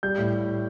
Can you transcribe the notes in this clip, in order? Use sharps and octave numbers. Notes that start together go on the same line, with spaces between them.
G3 G6
A2